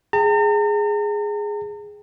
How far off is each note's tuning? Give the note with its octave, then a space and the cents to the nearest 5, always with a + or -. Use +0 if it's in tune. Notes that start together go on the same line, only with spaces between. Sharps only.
G#4 +0 G5 +0 A#5 -45